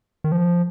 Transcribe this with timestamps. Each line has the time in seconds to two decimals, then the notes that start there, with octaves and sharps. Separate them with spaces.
0.24 D#3
0.32 F3